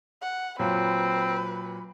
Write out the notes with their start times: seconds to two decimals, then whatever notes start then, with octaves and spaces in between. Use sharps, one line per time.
0.21 F#5
0.59 A#2 F#3 C4 B4